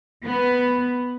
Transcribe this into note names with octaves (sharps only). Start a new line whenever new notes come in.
B3